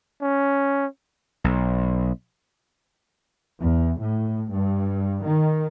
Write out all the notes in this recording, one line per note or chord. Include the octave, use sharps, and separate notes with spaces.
C#4
B1
E2
A2
G2
D#3